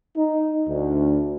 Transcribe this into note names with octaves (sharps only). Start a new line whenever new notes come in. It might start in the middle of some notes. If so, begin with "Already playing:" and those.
D#4
D2